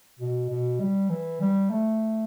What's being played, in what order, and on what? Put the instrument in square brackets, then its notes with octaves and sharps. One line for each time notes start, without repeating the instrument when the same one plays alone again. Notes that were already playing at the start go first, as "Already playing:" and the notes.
[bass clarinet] B2
B2
G3
E3
G3
A3